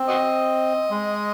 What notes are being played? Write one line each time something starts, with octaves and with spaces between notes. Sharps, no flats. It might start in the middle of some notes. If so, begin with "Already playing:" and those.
Already playing: C4
F#4 C5 D#5
G#3